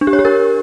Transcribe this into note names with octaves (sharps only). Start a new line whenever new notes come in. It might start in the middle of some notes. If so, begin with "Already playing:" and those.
D4
G4
C#5
G4
A#4